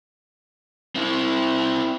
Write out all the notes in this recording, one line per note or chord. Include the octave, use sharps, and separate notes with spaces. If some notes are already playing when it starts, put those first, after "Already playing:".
C4 E4